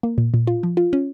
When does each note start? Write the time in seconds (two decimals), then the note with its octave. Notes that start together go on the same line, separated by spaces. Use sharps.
0.03 A#3
0.18 A#2
0.34 A#2
0.47 F4
0.63 F3
0.77 F4
0.93 C#4